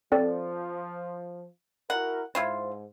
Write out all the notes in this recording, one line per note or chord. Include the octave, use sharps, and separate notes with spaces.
F3 C4 A4 D5
E4 F#4 A#4 F#5
G#2 E4 F4 C5